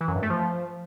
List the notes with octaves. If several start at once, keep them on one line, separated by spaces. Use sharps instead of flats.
E3
F#2
G2
A3
F3